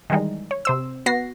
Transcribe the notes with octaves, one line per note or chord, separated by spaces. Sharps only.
D#3 E3 G3 G#3 D#4
C#5
C3 C5 E6
B3 F#4 A#6 C7